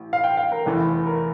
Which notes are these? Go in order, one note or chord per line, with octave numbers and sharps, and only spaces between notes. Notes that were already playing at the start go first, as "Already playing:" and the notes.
Already playing: A1
F5
G5
F5
A#4
F1 E2 E3 A4
A#4